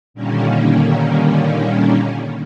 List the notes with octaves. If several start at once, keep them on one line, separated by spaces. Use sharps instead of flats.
A#2 D3 D#3 G3 A#3 C#4